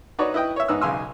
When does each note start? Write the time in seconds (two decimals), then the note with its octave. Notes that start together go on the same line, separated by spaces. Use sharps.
0.19 D#4 F#4 B4 C#5 D5
0.34 E4 B4 D#5 G5
0.56 C#5 E5
0.68 G#2 D#4 B4 E6
0.81 B1 C#3 F5 G#5 C6 E6